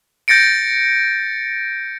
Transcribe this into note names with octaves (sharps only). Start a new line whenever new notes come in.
G6 A6 A#6 C#7 D7